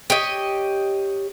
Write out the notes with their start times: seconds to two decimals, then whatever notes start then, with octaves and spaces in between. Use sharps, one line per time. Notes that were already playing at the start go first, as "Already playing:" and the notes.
0.10 G4 C#5 D#5